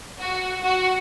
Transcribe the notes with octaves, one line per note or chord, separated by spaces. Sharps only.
F#4
F#4